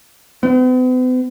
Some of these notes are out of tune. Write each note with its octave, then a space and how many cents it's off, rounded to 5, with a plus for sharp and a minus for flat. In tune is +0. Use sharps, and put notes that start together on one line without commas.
B3 +45